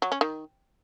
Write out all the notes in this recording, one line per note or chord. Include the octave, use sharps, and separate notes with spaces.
F#3
C#4
D#3